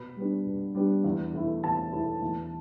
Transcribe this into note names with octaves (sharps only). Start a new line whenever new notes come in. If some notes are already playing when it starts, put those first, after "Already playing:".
Already playing: B2 B5
G3 B3 D4
B2
G3 B3 D4
E2
B2 A3 E4
E2 A5
B2 A3 E4
E2